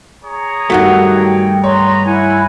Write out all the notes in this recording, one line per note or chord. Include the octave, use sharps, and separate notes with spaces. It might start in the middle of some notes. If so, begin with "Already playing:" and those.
G#4 C#5 A#5
G2 D#3 F#3 A3 F#5
G5
B3 B4 C#5 A#5 C6
E4 F#5 G#5